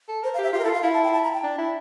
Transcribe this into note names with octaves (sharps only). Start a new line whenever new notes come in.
A4
A#4 C5
F5
G4 E5
F4 G4
A#4
E4 A4
F4 F5
E4 F5
A5
G5
A5
A#5
G5
D4
E4